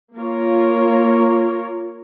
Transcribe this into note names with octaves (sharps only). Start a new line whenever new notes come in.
A#3 F4 A#4 C#5